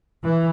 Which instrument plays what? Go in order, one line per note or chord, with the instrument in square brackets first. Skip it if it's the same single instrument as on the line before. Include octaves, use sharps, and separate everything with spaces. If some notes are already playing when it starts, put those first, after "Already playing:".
[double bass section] E3